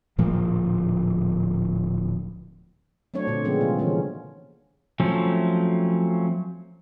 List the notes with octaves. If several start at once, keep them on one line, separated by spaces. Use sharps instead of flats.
D1 A#2 F3 A#3
F#3 A3 C4 D4 C#5
A#2 D3 A3 C4
C#3 F3 G#3 B3 C#4 G#4
C3 G3 F4
D3 E3 A#3 C#4
F3 F#3 A3 C4 C#4